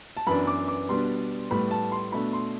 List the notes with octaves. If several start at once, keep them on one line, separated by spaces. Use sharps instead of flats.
A5
F#2 E3 B3 D4 B5
D6
D6
B2 G3 B3 D4 C6
A2 G3 B3 B5
A5
C6
B2 A3 D4 B5
C6